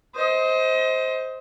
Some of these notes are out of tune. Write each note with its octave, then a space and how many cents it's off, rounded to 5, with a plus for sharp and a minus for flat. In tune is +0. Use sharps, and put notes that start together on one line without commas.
C5 +0 D#5 +30